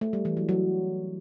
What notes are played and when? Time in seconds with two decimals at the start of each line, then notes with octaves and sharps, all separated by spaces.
0.01 A3
0.13 G3
0.25 E3
0.37 F#3
0.49 F#3